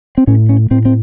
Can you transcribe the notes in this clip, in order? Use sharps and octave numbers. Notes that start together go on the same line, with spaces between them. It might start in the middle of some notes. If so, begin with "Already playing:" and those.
C4
A2 C#4
C#4
A2 C4
C4